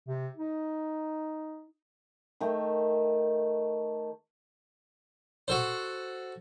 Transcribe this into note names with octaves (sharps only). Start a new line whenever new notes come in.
C3
D#4
D#3 A3 G5
F#4 A4 C5